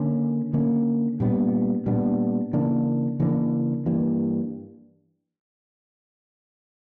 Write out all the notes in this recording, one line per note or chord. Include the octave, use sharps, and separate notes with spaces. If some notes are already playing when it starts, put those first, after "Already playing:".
Already playing: D3 A#3 C#4
D3 A#3 C#4
A#2 G3 B3 D4
A#2 G3 B3 D4
C#3 E3 A#3 D4
C#3 E3 A#3 D4
G2 E3 A#3